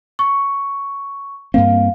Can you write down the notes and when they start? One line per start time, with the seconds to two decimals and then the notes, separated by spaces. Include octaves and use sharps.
0.19 C#6
1.54 G2 A#3 C4 F5